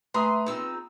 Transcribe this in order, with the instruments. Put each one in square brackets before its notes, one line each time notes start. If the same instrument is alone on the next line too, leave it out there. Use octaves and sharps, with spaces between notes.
[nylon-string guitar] A3 E5 G#5 [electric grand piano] B4 A#5 D#6 [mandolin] C6
[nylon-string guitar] C4 F4 G#4 [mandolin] D#4 E6